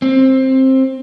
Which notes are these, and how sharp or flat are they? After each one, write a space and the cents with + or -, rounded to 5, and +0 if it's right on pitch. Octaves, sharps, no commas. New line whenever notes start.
C4 +15